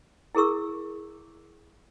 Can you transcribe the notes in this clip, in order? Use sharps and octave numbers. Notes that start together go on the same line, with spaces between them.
E4 G#4 A#4 C#6 E6